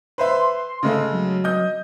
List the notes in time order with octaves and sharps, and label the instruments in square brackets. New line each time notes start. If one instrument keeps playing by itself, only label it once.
[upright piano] B4 C5 E5 [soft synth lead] C6
[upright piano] C#3 G#3 A3
[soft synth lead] F#3
[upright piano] D#5 D#6 G6